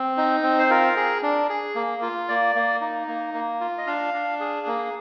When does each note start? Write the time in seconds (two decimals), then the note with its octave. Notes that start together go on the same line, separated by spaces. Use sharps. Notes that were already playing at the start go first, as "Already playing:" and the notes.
Already playing: C4
0.17 D#4
0.43 C4
0.59 C5
0.70 F4 A#4
0.96 G#4
1.23 D4
1.50 G#4
1.75 A#3
2.02 F4
2.28 A#3 D5
2.56 A#3
2.81 D#4
3.08 A#3
3.34 A#3
3.60 F4
3.78 D#5
3.87 D4 F5
4.14 D4
4.40 G#4
4.67 A#3